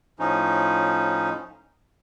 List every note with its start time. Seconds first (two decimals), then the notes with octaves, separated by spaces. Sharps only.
0.19 A2 F3 C#4 D#4